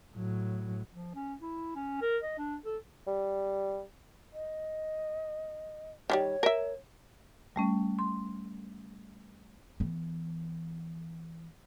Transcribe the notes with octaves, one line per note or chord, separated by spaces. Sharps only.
A2 F#3
F3
C#4
E4
C#4
A#4
D#5
D4
A4
G3
D#5
D#3 F3 G3 C#5
A#4 E5
G3 A3 C#4
C6
E3 B3